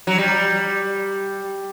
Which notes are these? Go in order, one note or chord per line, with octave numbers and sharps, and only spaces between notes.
F#3
G3